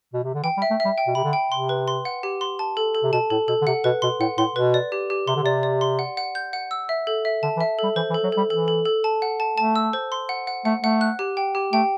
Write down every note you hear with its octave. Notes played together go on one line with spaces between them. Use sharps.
B2
C3
D3
E3 G5
G3
E5
A3
G3 E5
G5
B2
C3 B5
D3
G5
C3 C6
B4
C6
F#5
G4
C6
A5
A4
A4
C3
B2 A5
A2 A4
B2 A4
D3
C3 F#5
B2 B4
B2 C6
A2 F#5
A2 C6
B2 B4
D5
G4
G4
C3 C6
D3
C3 D5
D5
C6
F#5
F#5
G6
F#5
E6
E5
A4
E5
D3 A5
E3
E5
G3 A4
E3 C5
E3
A4
F#3
G3 A4
E3 A4
A4
A4
A5
F#5
A5
A3 A5
E6
C5
C6
F#5
F#5
A3 F#5
A3 F#5
F#6
G4
G5
G4
A3 G5